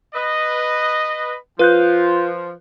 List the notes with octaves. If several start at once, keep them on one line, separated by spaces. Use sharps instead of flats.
B4 D#5
F3 F4 B4 F#6 G6